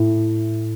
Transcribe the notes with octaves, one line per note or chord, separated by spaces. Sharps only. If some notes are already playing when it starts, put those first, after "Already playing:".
Already playing: A2